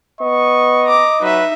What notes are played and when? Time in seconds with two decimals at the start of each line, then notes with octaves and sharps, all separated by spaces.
0.21 B3 D#5 C#6
0.86 A#5 D6
1.22 F#3 D#4 B4 E5